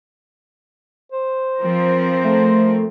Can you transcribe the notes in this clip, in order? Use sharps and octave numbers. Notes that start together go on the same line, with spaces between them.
C5
F3 C4 A#4
A3